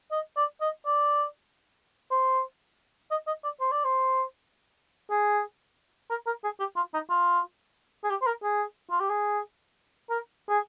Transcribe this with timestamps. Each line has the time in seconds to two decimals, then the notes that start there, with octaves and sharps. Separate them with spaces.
0.12 D#5
0.36 D5
0.61 D#5
0.86 D5
2.11 C5
3.11 D#5
3.27 D#5
3.44 D5
3.60 C5
3.72 D5
3.84 C5
5.11 G#4
6.10 A#4
6.26 A#4
6.44 G#4
6.60 G4
6.76 F4
6.94 D#4
7.09 F4
8.04 G#4
8.10 G4
8.21 C5
8.27 A#4
8.43 G#4
8.90 F4
9.00 G4
9.10 G#4
10.10 A#4
10.49 G#4